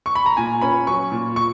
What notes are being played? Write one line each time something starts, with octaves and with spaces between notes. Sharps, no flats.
C#6
B5
A#5
A#2 G#5
C#4 B5
F#3 C#6
A#2
C#6